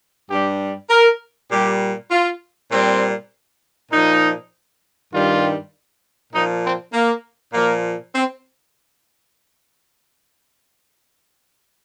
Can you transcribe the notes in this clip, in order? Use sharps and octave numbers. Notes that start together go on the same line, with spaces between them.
G2 G3 G4
A#4
A#2 G3 G4
F4
A#2 G3 C4
A#2 F3 D#4
G2 D#3 G3 F4
A#2 F3 D#4
C4
A#3
A#2 F3 A#3
C4